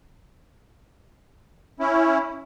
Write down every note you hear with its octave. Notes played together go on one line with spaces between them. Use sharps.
C#4 E4